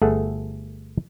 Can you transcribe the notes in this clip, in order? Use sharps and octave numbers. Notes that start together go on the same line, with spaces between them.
G1 A3 G#4 A4 F#5